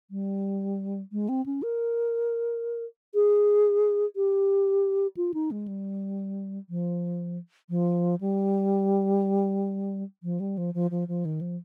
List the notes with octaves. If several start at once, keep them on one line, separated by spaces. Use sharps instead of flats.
G3
G#3
C4
C#4
A#4
G#4
G4
F4
D#4
G#3
G3
F3
F3
G3
F3
G3
F3
F3
F3
F3
D#3
F3